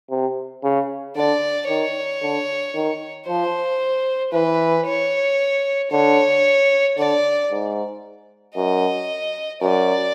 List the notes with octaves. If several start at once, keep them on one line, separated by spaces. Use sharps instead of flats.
C3
C#3
D3 D5
D#3 C#5
D3
D#3
F3 C5
E3 B4
C#5
D3 C#5
D3 D5
G#2
F#2 D#5
F#2 D5